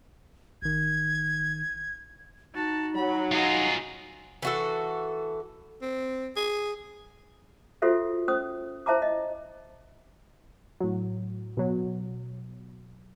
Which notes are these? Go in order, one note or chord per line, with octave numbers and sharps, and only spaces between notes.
A1 D#3 G#6
D#4 F#4 A5
F#3 B5
F4 G#4 D#5 A#5
E3 F#4 A4
C4
G#4
F4 F#4 A4 C5 E5
C#4 C5 D#6
E4 C5 E5 A5 A#5 D6
D#5
A2 F#3
B2 F#3